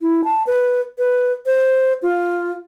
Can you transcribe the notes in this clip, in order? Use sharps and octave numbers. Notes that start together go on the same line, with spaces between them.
E4
A5
B4
B4
C5
F4